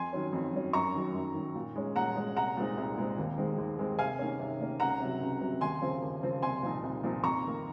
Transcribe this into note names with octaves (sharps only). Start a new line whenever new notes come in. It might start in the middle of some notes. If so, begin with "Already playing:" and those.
Already playing: F2 G#5 C6
D#3 F#3 C#4
F2
D#3 F#3 C#4
F#2 A#5 C#6
D#3 F#3
F#2
D#3 F#3
A#2
G#3 C#4
A#2 F#5 A#5
G#3 C#4
C2 F#5 A#5
A#2 G#3 C4 D#4
C2
A#2 G#3 C4 D#4
D#2
D#3 G#3 C4
D#2
D#3 G#3 C4
C3 F5 G#5
D#3 A#3 C#4
C3
D#3 A#3 C#4
C#2 F#5 A#5
C3 F#3
C#2
C3 F#3
D#2 G#5 C6
C#3 F3 C4
D#2
C#3 F3 C4
C2 G#5 C6
A#2 F3 C4 D#4
C2
A#2 F3 C4 D#4
F2 A#5 C#6
D#3 A#3